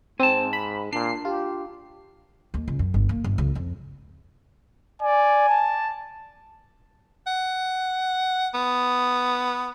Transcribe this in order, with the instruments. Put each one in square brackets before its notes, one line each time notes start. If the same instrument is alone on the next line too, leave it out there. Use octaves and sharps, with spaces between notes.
[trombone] G#2 [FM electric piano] C4 [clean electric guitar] G#5 A5
[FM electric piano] B5
[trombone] A#2 [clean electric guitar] D4 [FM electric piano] C7
[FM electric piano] F4 [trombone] G4
[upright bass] D#2
C#2
F#2
G1
A#3
G1
C#2
F2
[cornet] D5 [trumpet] G#5
[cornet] A5
[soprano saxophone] F#5
B3